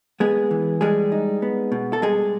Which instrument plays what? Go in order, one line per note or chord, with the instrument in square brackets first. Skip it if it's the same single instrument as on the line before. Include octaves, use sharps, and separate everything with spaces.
[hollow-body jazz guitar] G#3 B3 G#4
E3
G3 G#3 G#4
D#4
B3
B2
A4
G3 G#3 G#4